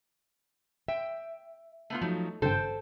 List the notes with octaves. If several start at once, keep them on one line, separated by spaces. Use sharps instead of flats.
E5 G5
A3 B3 F4
F3 F#3 A3 D#4
G#1 G2 C#3 A4 C5 G5